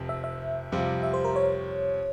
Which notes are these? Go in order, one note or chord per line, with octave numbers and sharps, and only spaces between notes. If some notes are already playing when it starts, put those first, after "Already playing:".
Already playing: F1 F2 C3 F3
E5
E5
F2 C3 G3 C4 F4
E5
C5
A#4
C#5